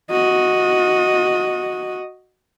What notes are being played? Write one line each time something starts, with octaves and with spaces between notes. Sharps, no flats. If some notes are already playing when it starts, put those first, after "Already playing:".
F#4 D#5